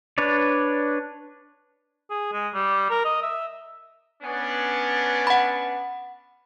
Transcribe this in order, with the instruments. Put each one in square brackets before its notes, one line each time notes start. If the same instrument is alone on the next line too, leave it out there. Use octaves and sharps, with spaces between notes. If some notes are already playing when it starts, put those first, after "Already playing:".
[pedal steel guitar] D4 B4 C#5 D5
[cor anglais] G#4
G#3
G3
A#4
D#5
E5
[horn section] B3 C#4 D4
[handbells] F#5 B5